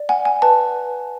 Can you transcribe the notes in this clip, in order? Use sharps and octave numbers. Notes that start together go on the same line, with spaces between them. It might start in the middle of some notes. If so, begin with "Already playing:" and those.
Already playing: D5
F#5 G#5
G#5
B4 A5